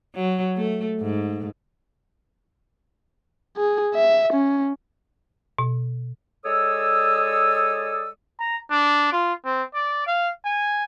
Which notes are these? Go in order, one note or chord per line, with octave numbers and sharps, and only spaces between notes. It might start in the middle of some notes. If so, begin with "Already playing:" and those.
F#3
A3
G#2
G#4
E5
C#4
B2
G#3 A4 C#5 D5 D#6 E6
A#5
D4
F4
C4
D5
F5
G#5